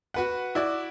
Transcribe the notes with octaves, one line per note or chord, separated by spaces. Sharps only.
F#4 B4 F#5
E4 F#4 D5 D6